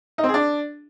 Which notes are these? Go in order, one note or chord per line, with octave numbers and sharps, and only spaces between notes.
D#4
C4
G#4
D4